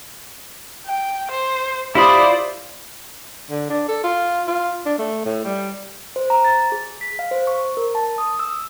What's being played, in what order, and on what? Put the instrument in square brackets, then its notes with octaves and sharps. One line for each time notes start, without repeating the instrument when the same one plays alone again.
[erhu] G5
C5
[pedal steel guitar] E4 F4 B5 [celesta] G4 C6 D#6 [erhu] C5 [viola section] D5
[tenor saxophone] D3
D4
A4
F4
F4
D4
A3
A2
G3
[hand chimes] C5
A#5
A6
G#4
B6
F5
C5
C#6
A#4
A5
D#6
E6